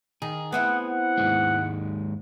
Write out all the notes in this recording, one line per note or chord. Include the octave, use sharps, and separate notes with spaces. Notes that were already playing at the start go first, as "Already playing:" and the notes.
D#3 G#4
B3 C4 E4 F#5
F#5
D#2 G#2 G#3